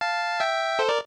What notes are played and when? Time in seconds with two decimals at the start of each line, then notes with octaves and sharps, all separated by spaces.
0.01 F5 A5
0.40 E5 G5
0.79 A4 C5
0.89 A#4 D5